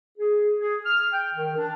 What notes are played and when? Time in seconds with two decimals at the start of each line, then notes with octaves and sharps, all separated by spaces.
0.18 G#4
0.59 G#4
0.85 F6
1.12 G5
1.34 D#3
1.57 D4